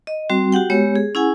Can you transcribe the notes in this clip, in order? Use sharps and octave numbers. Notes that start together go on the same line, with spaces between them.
D#5
G3 C4 F#4
F#4 G4 F#5 G5
G#3 B3 G4 C#5
G#4
C#4 E4 G#4 F#5 G#5